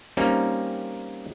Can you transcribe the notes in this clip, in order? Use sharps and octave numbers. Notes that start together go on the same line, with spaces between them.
G3 A#3 C4 C#4 D#4